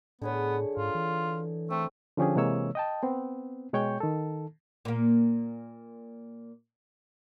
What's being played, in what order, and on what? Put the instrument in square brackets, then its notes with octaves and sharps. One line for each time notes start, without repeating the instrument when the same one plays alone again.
[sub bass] A2 [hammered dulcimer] D3 G#4 C#5 [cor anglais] B3
[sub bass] G#2 [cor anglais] F4
[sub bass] E3
[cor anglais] A3 [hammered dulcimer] C4
[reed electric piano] D3 F3 C#4 G4 G#4
C3 E3 G#3 A#3 C#5 E6
D#5 G5 A5
B3 C4
B2 G#3 C#5 G5 C#6 G6
D#3 A4
[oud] A#2 A#3